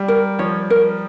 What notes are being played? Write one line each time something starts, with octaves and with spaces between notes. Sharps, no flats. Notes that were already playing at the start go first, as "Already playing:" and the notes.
Already playing: G3
A#4
F3 C#5
A#4